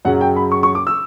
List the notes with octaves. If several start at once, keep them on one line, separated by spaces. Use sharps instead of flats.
F#2 C#3 F#3 F#5
G5
B5
C#6
C#6
D6
E6